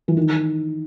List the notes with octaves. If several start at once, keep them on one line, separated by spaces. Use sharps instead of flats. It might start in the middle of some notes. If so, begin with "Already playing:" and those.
E3
D#3